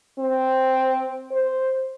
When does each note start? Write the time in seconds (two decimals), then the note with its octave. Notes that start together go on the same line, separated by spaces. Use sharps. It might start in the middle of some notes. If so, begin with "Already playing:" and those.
0.19 C4
1.31 C5